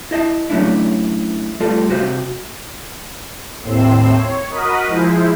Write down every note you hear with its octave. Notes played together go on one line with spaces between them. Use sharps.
E4 D#5 E5 A5
F#3 A3 C#4 D4 E4
G3 A3 F4 A4 D5
C3 F#4 G4 C5 F5
D#2 A2 C4 C6 E6
C#5
F#4 A#4 D#5 B5 D#6
F3 G#3 E4 C5